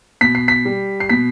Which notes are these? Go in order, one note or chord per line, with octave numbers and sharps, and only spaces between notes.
B2 B6
C7
B6
G3
C7
B2 B6